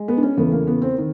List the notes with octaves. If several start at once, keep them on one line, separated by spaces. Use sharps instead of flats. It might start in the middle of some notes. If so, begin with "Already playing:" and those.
Already playing: G#3
B3
D4
C#4
E2 C#3 E3 A3 B3
A#3
B3
C4
D#3